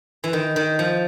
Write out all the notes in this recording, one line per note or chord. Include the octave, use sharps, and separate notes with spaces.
E3
D#3
D#3
F3